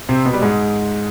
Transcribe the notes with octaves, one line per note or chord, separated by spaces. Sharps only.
C3 C4
B2 B3
G3
G#2 G#3